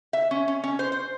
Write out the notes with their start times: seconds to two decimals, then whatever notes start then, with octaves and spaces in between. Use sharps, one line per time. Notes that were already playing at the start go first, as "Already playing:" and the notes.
0.13 E5
0.31 C#4
0.48 C#4
0.64 C#4
0.79 C5
0.92 C5